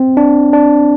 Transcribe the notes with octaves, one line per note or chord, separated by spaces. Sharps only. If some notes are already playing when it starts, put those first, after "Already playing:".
Already playing: C4
D4
D4